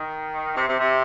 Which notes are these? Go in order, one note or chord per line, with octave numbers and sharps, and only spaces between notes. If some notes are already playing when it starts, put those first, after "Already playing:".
Already playing: D#3
C3
C3
C3